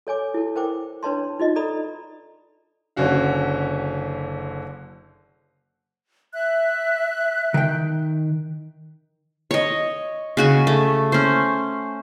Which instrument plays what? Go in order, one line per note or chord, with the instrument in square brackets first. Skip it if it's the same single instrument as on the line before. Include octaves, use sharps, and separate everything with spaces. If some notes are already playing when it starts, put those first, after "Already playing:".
[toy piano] A4 C#5 G#5 D6
E4 A4
A#4 C5 G5 D6
D4 B4 C#5 A5 C6
D#4 F4 D#5
A4 D5 A#5 B5 D#6
[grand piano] F#1 D3 C#4 F#4 F5
[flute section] E5 F#6
[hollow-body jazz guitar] D#3 G5
[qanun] C#5 D#5
C#3 F#4 G#5
A3
C#4 C5